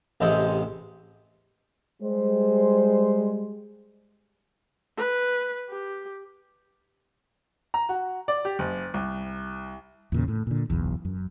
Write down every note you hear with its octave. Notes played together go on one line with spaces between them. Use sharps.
A1 C3 G#3 A4 G5
G3 G#3 C5
B4
G4
A#5
F#4
D5
G4
F#1
C2
E2 A#2 C#3
A2
A#2 D3
F#1 B1 E2
F#2